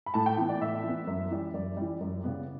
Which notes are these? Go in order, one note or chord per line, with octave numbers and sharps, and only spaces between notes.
B5
A2 A5
G5
E3 B3 G5
D5
A2 E5
E3 B3
F#2
E3 G3
F#2 D5
E3 G3
F#2
C#3 G3 B3